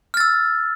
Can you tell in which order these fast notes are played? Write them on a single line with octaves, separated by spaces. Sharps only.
F6 A6 E6